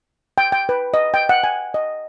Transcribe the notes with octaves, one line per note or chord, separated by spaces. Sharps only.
G5
G5
B4
D#5
G5
F#5
G#5
D#5